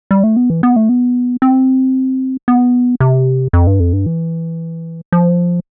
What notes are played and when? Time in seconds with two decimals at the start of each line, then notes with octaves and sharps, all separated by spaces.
0.11 G3
0.24 A3
0.37 B3
0.50 E3
0.63 B3
0.76 A3
0.89 B3
1.42 C4
2.48 B3
3.00 C3
3.53 F2
3.67 G2
3.80 F2
3.93 G2
4.06 E3
5.12 F3